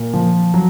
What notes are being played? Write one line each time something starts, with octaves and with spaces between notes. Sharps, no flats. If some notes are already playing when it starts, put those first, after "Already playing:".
Already playing: A#2
F3
F#3